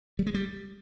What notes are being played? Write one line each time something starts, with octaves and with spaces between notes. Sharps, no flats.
G3
G#3
G3